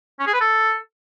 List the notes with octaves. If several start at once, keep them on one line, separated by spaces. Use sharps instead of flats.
C#4
G#4
B4
A4